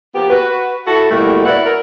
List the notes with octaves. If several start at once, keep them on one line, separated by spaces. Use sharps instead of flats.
F3 A#3 B3 G4
F#4 B4
E4 F#4 A4
F2 B2 G3 A3 A#3 E4
E4 F#4 A#4 B4 D5 F#5
A#4